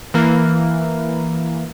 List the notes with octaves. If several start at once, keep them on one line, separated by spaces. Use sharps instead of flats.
E3 A#3